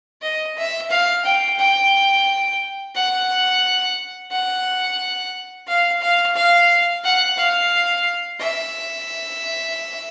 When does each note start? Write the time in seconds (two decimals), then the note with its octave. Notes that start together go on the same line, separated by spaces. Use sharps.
0.22 D#5
0.56 E5
0.90 F5
1.24 G5
1.58 G5
2.95 F#5
4.31 F#5
5.67 F5
6.01 F5
6.35 F5
7.04 F#5
7.38 F5
8.40 E5